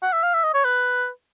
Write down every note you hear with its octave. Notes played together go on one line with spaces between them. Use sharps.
F#5
E5
F5
E5
D#5
C#5
B4